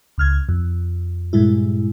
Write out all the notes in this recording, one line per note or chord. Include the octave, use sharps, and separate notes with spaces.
C#2 F6 G#6
F2
G2 A#2 G#3 E4